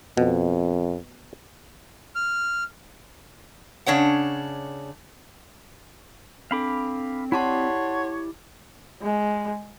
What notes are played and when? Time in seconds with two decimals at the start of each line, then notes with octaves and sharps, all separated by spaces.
0.17 F2 B2
2.15 F6
3.86 C#3 D4 C#5 F#5
6.51 C4 D4 A4 F5 B5 D6
7.32 E4 G4 C#5 D5 F#5 A5 C6
9.02 G#3